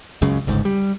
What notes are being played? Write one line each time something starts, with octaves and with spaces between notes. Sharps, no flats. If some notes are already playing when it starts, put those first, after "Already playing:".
C#2 F#2 C#3
G1 C#2 G#2
G3